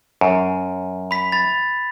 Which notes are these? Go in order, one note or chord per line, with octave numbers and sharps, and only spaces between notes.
F#2
B5 B6
B5 A6